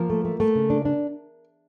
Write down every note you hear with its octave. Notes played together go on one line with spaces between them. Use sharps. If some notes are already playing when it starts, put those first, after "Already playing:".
Already playing: F3 A#3 A#4
A3
A3
A3
C#3
D4
D4